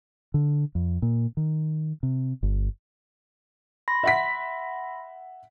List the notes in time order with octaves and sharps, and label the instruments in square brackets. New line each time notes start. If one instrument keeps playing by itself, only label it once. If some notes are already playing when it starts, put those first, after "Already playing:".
[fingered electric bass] D3
F2
A#2
D#3
C3
G1
[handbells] B5 C6 A#6
[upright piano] E5 F#5 B6